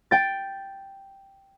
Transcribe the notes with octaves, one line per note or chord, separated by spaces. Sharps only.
G5 A6